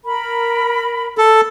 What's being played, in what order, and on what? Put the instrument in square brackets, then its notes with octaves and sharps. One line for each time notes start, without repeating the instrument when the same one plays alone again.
[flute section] A#4 B5
[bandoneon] A4